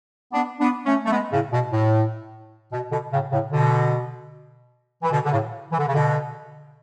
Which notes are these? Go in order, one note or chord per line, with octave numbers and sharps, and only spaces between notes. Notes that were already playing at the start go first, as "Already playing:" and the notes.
B3 D4
B3 D4
A3 C#4
A3
G#3 B3
A2 C#3
B2
A2
B2
B2 D3
A2 C#3
A2 C#3
B2 D3
E3
B2 D3
D3
A2 C#3
E3
D3
C#3
B2 D3